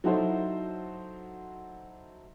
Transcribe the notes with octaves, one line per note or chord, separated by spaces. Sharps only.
F#3 D#4 E4 F#4 A4 C5